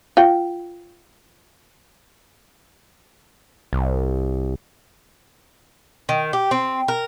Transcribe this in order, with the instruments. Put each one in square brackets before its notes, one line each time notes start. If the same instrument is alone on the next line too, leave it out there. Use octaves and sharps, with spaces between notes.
[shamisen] F4 G5
[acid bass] C2
[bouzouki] D#3
G4
C4
A#4